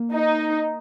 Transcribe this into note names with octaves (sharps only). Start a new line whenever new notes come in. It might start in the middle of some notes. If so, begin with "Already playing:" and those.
Already playing: A#3
D#4